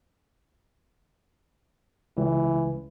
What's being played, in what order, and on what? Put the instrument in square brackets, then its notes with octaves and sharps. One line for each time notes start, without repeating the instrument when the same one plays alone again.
[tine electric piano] C#2 [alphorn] E3